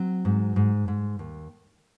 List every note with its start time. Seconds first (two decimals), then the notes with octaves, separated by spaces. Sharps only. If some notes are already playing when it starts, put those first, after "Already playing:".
Already playing: F#3 C4
0.25 G#2
0.56 G#2
0.88 G#2
1.19 D#2